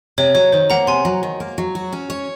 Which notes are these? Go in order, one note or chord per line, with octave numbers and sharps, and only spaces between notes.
C3 C#5
F#3 C#5
D#3 C5
A#3 F#5 A#5
C3 G#5 C6
F#3
D#3
A#3
F#3
F#4
C#4
C#5